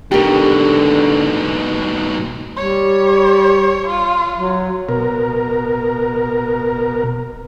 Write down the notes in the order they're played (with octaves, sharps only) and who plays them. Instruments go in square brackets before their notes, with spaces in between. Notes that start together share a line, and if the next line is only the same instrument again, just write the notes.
[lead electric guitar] G#2 B2 [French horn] D3 [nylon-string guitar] G4 A#4
[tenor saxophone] G3 [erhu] C#5
[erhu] F4
[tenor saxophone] F#3
[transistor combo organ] B2 A#4